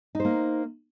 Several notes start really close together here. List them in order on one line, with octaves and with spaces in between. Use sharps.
D#4 C5 A#3